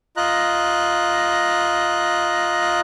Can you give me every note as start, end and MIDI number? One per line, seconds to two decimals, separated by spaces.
0.17 2.81 65
0.17 2.81 75
0.17 2.81 82
0.17 2.81 90